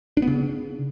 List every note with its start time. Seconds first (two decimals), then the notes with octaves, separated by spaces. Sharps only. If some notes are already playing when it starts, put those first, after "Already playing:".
0.17 D4
0.22 B3
0.27 C#3